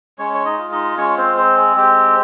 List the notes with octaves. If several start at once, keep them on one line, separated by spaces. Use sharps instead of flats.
G#3 C#4 C#5
C#5
D#4 D#5
F4
D#4 D#5
G#3 C#4 C#5
C4 C5
C4 C5
G#4
G#3 G4